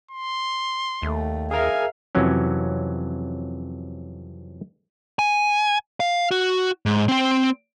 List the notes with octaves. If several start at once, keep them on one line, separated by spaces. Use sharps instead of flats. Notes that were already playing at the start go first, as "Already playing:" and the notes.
C6
D#2 A3
G#4 A#4 E5 F5 G#5 A#5
F2 C3 E3 F#3 C#4
G#5
F5
F#4
G#2
C4 G5